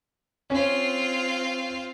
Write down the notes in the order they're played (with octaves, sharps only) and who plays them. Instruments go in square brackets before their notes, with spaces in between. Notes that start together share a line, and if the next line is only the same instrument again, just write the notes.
[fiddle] C4 F4 [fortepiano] C#4